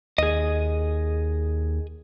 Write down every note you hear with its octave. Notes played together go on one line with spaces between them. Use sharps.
D#2 G#4 D#5